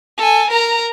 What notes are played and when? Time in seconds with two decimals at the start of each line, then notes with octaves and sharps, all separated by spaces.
0.18 A4 G#5
0.51 A#4 A#5